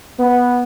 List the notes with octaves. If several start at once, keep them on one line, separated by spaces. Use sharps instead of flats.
B3